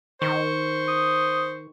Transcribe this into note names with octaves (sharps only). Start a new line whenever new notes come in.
D#3 C5 C#6
D#6